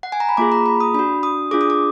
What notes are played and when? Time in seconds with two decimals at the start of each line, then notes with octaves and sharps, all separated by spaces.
0.03 F#5
0.12 G#5
0.20 A#5
0.29 B5
0.37 A#3 F4 G#4 D6
0.52 A#5
0.66 B5
0.80 D#6
0.94 D4 B5
0.99 F#4
1.23 D#6
1.51 D4 F4 G#4 D6
1.61 D#6
1.70 D6